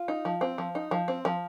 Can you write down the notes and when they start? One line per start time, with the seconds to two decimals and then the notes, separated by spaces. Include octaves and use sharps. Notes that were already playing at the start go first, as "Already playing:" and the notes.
Already playing: F4
0.08 D#4
0.25 F3
0.41 C4
0.58 F3
0.75 D#4
0.91 F3
1.08 C4
1.25 F3